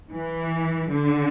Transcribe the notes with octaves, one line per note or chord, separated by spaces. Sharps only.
E3
D3